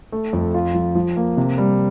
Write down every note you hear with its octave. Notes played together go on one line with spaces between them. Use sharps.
A3
F2
F4
F3
F3
A#3
C3
G3